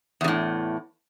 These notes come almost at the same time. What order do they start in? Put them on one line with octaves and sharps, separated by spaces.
E2 C#3 A2